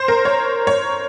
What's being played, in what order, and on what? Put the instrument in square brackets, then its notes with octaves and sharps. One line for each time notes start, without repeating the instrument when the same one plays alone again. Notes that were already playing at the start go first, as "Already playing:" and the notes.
Already playing: [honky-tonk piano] C5
A#4
C#5
C#5